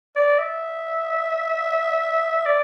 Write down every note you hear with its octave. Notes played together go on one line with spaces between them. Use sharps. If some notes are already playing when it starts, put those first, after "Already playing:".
D5
E5
D5